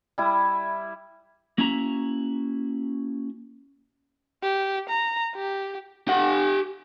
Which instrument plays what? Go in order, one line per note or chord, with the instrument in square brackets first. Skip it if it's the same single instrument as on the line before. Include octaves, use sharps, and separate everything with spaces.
[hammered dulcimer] G3 E4
[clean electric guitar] A#3 C#4 E4 F#4 E5 A#5
[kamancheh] G4
A#5
G4
[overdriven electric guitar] G4 F#5